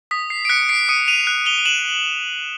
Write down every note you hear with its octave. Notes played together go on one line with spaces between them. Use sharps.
D#6 B6
C7
D7
F#6 B6 C#7
C7 D7
D#6 C#7 D#7
D#7 F7
F#6
F7 G7
F7
E7 F#7